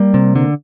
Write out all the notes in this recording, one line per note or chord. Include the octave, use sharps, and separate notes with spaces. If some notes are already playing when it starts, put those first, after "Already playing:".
Already playing: G3 A#3
C3
D3